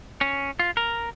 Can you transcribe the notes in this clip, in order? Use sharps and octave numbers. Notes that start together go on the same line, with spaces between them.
C#4
F4
A#4